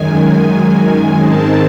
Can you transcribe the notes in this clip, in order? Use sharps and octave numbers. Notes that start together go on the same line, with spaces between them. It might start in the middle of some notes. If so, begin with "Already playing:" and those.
Already playing: F#2 D#3 G#3 G#5
G#2 D#3 G#3 C4 A5